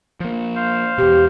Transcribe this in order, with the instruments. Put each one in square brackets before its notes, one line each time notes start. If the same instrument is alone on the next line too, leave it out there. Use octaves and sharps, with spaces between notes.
[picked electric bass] F3 A#3
[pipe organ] C5 F5
[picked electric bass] E2 B2 [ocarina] G4